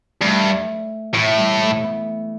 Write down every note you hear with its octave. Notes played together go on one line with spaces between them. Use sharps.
G2 A3
A2 E3
G3
A3
B3